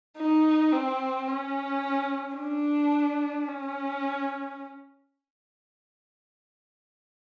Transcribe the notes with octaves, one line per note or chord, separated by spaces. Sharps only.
D#4
C4
C#4
D4
C#4